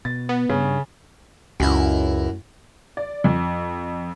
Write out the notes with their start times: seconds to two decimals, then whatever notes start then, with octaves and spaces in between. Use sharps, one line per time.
0.05 B2 A6
0.29 B3
0.49 G2 C#3
1.60 C#2 F#2 E4
2.97 D5
3.24 F2